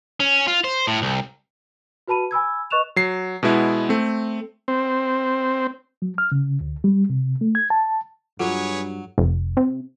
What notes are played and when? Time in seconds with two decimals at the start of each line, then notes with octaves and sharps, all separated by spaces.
0.20 C#4
0.48 F4
0.64 C5
0.87 A2
1.02 C2
2.08 F#4 B4 A5 B5 D#7
2.31 G#5 B5 E6 G#6
2.70 B4 D#5 C#6 F#6 E7 F7
2.96 F#3 C7
3.43 B2 G#3 B3 E4
3.89 A3 C4
4.68 C4
6.02 F#3
6.18 F6
6.32 C#3
6.61 D2
6.84 G3
7.10 C3
7.41 A3
7.55 G#6
7.70 A5
8.40 G2 F#3 F4 G#4 A4 B4 C#5
9.18 F1
9.57 C3